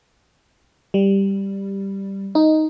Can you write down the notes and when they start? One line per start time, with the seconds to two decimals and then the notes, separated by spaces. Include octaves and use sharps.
0.94 G3
2.35 D#4